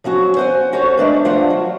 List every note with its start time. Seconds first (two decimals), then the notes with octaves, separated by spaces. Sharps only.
0.04 F3 F#3 C#4 F#4
0.37 C5 F#5 G#5
0.72 C#4 F#4 A4 C5 C#5
0.97 G#3 A3 D4 B4
1.25 G2 F3 D4 F4 C5 F#5
1.50 F#3